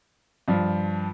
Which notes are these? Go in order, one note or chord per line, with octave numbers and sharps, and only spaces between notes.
G2 F3